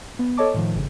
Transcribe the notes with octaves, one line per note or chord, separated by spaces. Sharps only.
B3
A4 C#5 D#5 A5 D6
A2 D#3 F3
G1 C#3